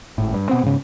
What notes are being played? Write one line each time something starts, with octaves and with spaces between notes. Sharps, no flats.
G#1 A2
G2
B2 B3 C4
G#2 C#3